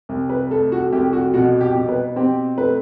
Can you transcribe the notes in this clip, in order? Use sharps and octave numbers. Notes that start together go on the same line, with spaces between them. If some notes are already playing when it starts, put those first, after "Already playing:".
C2
B4
A3 A4
F#4
C2 G4
F#4
B2 F#4
G4
B2
B4
C4 G4
A3 B4